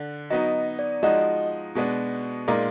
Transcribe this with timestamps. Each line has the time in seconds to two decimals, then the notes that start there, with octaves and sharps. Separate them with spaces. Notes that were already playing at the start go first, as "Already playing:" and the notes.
Already playing: D3 D4
0.30 F#3 B3 D#4 D#5
0.79 D5
1.03 F3 G#3 D#4 F#4 D#5
1.75 B2 G#3 B3 D4
2.48 A#2 G#3 D#4 A#4 D5 F5